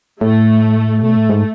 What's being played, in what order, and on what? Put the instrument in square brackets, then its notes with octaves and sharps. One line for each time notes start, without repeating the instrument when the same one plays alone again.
[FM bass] A2 [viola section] A3
[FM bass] B2 [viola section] A3
[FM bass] A2
G#2